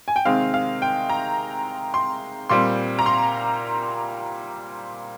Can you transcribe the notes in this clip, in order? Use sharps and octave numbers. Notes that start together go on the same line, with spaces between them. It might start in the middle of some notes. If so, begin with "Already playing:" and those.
G#5
G5
C3 D#3 G#3 C4 F5
F5
G5
A#5
C6
A#2 G3 C4 C6
A#5
C6